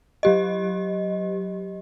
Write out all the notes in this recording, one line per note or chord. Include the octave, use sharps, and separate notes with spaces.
F#3 G4 D#5